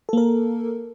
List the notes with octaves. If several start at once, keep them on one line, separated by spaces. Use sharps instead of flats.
A#3 A4 A#4